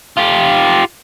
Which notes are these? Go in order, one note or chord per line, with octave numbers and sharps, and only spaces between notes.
F4 G4